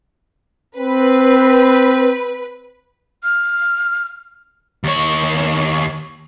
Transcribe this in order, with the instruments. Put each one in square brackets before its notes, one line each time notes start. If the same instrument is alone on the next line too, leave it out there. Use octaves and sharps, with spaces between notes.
[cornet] C4 [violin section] B4
[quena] F6
[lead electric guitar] D#2 C#5